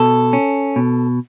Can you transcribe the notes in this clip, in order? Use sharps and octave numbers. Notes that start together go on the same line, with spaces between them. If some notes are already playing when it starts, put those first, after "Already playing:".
Already playing: B2 A4
C#4
B2